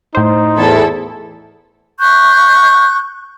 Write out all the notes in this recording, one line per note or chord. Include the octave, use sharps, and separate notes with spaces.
A2 D#4 C5
E2 E4 A4
C#6 F#6 G6